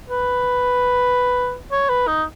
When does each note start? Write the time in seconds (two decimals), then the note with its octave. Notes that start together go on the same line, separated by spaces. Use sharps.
0.10 B4
1.72 C#5
1.89 B4
2.08 D#4